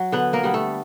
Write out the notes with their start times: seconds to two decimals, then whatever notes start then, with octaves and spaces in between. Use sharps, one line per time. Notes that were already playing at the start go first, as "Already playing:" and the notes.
Already playing: F#3
0.12 D3 B3 B4
0.33 A#3 A#4
0.44 G3 B3
0.54 A3 A4